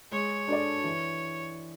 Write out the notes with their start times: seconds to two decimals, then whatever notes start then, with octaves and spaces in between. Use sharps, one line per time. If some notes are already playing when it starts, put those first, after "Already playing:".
0.11 G#3 C#5
0.48 D4 A4 D5
0.84 E3